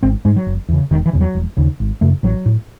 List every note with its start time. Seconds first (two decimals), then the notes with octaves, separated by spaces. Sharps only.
0.03 G#1 C4
0.25 G#2 G#3
0.36 F#3
0.47 F#1
0.69 E2 C#3
0.91 E1 D#3
1.06 E3
1.13 E2 C#3
1.21 F#3
1.35 E1
1.57 D#2 C#3
1.80 G#1
2.01 F#2 C#3 A3
2.23 A1 F#3
2.46 A2